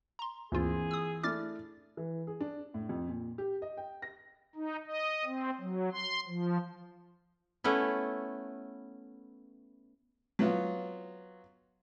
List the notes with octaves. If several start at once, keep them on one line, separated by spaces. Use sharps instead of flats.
A#5 C6
D2 G2 E3 A#3 C4 F4 G#4
D#6 E6
A3 D4 E4 D6 F6 A6
E3
G#4
D4
A2
F2
A#2
G4
D#5
G5
A#6
D#4
D#5
C4
F#3
C6
F3
A3 B3 C#4 E4
F#3 B3 F4